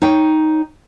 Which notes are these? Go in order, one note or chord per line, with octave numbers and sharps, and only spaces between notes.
D#4 C#5 G5